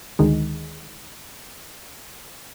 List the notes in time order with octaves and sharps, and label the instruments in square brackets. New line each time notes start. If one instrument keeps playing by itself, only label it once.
[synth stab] D2 D#3 G#3